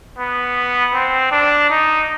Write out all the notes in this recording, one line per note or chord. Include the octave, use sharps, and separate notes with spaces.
B3
C4
D4
D#4